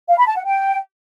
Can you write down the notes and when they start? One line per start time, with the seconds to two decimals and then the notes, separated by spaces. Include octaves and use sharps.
0.09 F5
0.18 B5
0.27 A5
0.36 F#5
0.45 G5